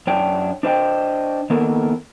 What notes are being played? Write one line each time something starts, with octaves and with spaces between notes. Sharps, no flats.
F#2 D4 C#5 G5
D4 C5 D#5 G5
D#3 A#3 B3 A4 A#4